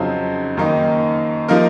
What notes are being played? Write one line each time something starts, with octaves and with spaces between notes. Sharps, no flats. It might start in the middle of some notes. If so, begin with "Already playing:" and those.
Already playing: F2 C#3 F#3 C4 D#4 C5
F#2 D#3 A#3 D#4
F3 A#3 D#4 A#4